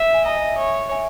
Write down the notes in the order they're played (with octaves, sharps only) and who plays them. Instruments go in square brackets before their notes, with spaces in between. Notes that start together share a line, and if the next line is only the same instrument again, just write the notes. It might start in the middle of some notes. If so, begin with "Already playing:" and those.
Already playing: [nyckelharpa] E5
[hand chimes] G#5
[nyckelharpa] D#5 [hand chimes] A#5
[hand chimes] E5 G#5
[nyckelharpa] C#5
[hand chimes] E5 G#5